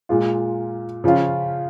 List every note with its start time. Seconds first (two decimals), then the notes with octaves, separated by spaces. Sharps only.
0.09 A#2 G#3 F4
1.04 C#3 F3 C#4 F4